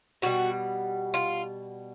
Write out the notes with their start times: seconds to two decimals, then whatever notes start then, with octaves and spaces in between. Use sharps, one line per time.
0.22 B2 G3 F#4
1.14 F4